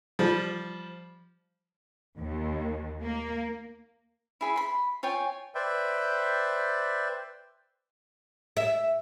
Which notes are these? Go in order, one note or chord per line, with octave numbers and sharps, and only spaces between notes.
F3 G3
D#2
A#3
E4 G#4 B5
B5 C6
F4 C#5 G5 G#5
B4 C5 D5 E5 G5
E5